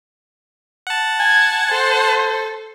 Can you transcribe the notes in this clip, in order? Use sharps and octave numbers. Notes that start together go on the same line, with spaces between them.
F#5 A5
G#5 G#6
A4 C5